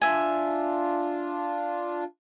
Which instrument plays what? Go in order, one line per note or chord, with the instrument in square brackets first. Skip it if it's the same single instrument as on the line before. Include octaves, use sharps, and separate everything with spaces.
[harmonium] D4 F4 [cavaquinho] E5 G#5